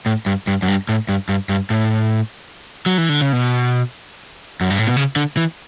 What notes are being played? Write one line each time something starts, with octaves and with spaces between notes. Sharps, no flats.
A2
G2
G2
F#2
G2
A2
G2
G2
G2
A2
F#3
E3
D3
C#3
B2
F#2
G2
A2
B2
C#3
D3
E3